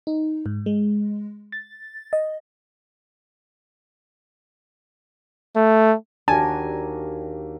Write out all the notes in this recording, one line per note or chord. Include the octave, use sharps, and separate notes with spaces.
D#4
G#2
G#3
A6
D#5
A3
D#2 D4 F#4 G4 A#4 G#5 A5